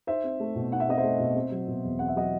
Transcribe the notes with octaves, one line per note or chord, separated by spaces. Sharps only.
D#4 C5 E5
C4
A3
B2
D#4 F#5
E5
C4 D#5
C5 E5
A3
B2
C4
F#3
B2
E2
C4 F#5
E5
F#3 D#5 F#5